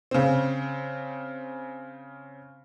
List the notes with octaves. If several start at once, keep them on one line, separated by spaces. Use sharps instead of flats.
C#3 C4